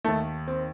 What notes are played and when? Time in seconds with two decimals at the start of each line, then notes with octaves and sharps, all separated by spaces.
0.05 D#2 D#3 A3
0.48 C4